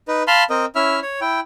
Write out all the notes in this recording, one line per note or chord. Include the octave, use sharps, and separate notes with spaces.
D#4 B4
F5 A5 B5 C6 F6
C4 A#4 D#5
C#4 E4 E5 F6
C#5
E4 G5